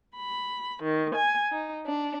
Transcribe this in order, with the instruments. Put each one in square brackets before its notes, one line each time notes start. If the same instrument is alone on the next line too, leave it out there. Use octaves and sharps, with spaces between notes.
[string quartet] B5
D#3
G#5
D#4
D4